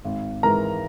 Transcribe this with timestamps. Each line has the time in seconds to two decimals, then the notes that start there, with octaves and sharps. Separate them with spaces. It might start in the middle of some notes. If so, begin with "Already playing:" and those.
0.05 G#1
0.43 G#2 E3 G#3 A#4 A#5